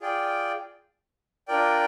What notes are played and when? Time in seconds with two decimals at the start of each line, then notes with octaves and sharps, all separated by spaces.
0.01 F4 G#4 D5 G5
1.48 D4 F4 A#4 D5 G5